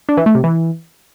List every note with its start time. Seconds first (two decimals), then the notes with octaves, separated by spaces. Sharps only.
0.09 D4
0.17 E3
0.26 A3
0.35 C3
0.44 E3